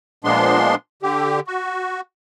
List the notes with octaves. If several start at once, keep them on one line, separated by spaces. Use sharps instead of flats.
A#2 F3 G#3 B3 D4 C6
D3 G4
F#4